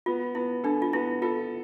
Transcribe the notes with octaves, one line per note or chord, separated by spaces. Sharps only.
B3 F4
B3 E4
D4 A4
F4
B3 E4
F4 A4